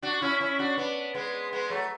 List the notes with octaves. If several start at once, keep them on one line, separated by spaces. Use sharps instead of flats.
D4 F#4
C#4 E4
C#4 E4
D4 F#4
B3 D4
G#3 B3
G#3 B3
F#3 A3